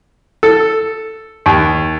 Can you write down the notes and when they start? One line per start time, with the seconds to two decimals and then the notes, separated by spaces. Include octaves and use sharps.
0.43 A4
1.46 D#2